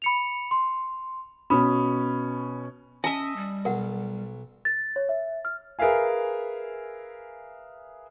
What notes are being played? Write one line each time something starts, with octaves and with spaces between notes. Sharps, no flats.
B5 C#7 F7
C6
B2 C#4 B5 D#6
C#4 D#5 E5 G#5 A5
G3
B1 A#4 F#5
A6
C#5
E5
F6
G#4 A#4 B4 E5 F5 G#5